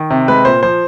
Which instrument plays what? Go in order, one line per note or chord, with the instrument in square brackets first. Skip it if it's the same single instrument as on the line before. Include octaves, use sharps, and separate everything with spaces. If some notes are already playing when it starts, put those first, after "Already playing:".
Already playing: [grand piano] D#3
C3
G#3 B4
A#2 C5
F3 C5